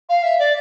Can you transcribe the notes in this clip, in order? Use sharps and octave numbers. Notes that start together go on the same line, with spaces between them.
F5
E5
D5